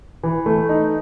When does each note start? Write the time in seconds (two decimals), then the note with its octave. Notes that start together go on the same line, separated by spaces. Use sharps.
0.23 E3
0.46 A3
0.69 D#4